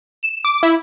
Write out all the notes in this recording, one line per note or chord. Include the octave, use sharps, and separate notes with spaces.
E7
D6
E4